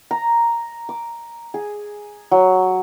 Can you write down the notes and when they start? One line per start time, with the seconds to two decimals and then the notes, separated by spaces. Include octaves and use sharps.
0.11 A#5
0.89 D6
1.54 G#4
2.31 F#3